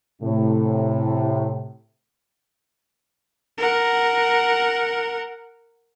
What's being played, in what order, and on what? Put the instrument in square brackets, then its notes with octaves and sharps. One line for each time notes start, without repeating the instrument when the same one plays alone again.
[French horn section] A2 C3
[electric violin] A#4 F#5